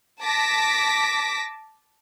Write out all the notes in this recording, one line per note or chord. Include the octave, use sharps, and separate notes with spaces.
A5 D6 A#6 B6